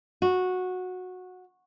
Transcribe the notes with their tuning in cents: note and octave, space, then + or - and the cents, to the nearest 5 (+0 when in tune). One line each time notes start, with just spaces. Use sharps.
F#4 -15